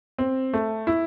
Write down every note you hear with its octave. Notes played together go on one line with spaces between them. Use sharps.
C4
A3
E4